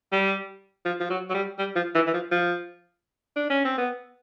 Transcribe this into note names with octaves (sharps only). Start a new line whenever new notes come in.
G3
F3
F3
F#3
F#3
G3
G3
F3
E3
E3
F3
F3
D4
C#4
C4
B3